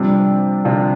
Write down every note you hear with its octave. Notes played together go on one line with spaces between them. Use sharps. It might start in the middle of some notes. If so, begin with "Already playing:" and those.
Already playing: C3 F3 G3 C4 D4 F4
C3 F3 D4 F4